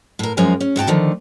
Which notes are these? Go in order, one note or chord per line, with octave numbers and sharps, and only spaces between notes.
A2 A#4
F#2 F3 G#3 A#4 G#5
C#4
G#2 F#4 G5 A5
D3 D#3 F3 A3